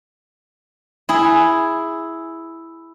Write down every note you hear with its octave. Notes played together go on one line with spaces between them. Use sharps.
E4 G#4